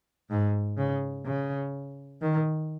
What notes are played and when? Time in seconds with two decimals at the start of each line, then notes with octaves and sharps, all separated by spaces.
0.30 G#2
0.78 C#3
1.26 C#3
2.22 D#3